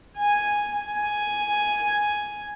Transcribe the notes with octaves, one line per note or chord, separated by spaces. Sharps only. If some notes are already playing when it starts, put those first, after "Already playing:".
G#5
G#5